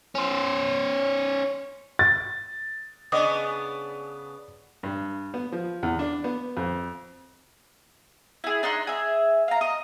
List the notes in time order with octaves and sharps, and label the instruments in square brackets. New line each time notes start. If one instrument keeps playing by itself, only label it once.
[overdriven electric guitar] C#4 C5
[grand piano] A6
[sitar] C#3 B3 D4 [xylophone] D#5 D6 D#6
[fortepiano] G2
B3
F3
E2
D4
B3
F2
[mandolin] E4 G#4
D4 D#4 C6 F#6
G#4 E5
F5 A#5
D#5